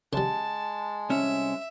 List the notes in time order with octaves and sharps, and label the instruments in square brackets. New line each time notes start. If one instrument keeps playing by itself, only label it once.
[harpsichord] C#3 G3 [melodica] G#3 [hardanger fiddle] A5
[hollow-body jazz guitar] C2 C#4 [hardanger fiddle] E5